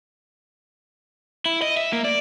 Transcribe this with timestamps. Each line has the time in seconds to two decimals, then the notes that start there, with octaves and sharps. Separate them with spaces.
1.46 E4
1.62 D#5
1.77 E5
1.93 A#3
2.04 D5